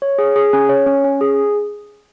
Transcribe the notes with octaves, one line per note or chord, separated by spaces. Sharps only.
C#5
G#4
G#4
C#4
C#5
C#4
C#4
G#4